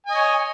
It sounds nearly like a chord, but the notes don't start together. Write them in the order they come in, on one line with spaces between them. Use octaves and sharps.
G#5 D#5 C#5